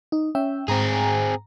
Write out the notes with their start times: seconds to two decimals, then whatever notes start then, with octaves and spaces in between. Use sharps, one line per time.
0.12 D#4
0.35 C#4 E5 G5
0.68 G#2 C4 G#4 A#5